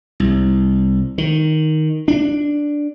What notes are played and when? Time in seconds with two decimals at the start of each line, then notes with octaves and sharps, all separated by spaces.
0.20 C2
1.18 D#3
2.08 D4